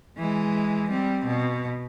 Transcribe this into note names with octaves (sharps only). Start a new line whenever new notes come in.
E3 G#3
G3 C4
B2